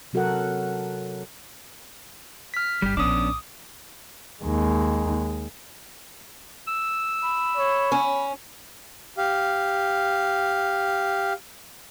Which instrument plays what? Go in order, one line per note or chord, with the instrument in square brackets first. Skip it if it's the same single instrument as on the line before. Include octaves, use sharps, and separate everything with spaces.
[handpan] C3 F#3 F#4 A4 A#4 F#5
[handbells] F6 B6
[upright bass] G1 [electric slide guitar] G3 G4
[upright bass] A#1 F3 [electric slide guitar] B3 C#4 D4 [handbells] D6 D#6
[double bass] D#2 G#3
[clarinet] E6
[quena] B5
[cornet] C#5
[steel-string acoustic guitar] C#4
[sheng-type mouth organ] G4 F5